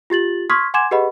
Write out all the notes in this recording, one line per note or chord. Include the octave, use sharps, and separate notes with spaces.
F4 G4 A6 F#7
C6 C#6 D#6 F6 G#6 B6
F#5 G#5 C6 D6 G#6 E7
G4 G#4 B4 D#5 F#5 B5